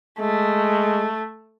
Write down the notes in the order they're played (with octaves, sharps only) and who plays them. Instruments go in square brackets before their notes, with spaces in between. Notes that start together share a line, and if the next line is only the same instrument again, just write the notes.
[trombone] G#3 [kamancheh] A3